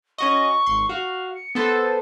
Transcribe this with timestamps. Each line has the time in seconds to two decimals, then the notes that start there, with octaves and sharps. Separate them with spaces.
0.18 C#4 F#4 D#5 C#6
0.66 G#1 C6
0.89 F#4 F5
1.35 C#7
1.55 B3 A4 C5 A6